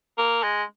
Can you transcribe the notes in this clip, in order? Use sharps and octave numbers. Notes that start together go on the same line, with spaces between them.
A#3
G#3